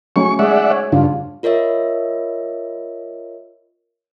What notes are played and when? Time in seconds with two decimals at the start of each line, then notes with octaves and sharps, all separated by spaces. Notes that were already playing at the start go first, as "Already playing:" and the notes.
0.16 F#3 A3 C#4 C#6
0.39 G#3 G#4 D5 E5 F#5
0.71 C#5
0.92 G2 C#3 D4 F4
1.43 F4 A#4 C#5 D#5 E5